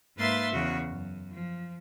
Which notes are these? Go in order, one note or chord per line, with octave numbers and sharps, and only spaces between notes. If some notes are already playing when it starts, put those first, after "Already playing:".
G#2 A#3 B4 E5 C6 A6
E2 C#3 F#4
F#2
F3